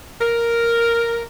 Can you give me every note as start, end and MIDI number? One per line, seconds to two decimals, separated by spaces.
0.20 1.22 70